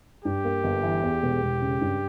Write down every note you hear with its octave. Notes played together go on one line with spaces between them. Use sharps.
G2 G4
A#3
G1
E3
E2
E1
E1
C#3
G2